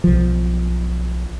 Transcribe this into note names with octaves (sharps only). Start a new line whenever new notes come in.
B1 F3